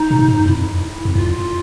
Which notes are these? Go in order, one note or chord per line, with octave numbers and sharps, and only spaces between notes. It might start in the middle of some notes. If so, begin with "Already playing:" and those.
Already playing: D#4
A#2
A2
G#2
F#2
F2 E4
F2
E2 F4
F2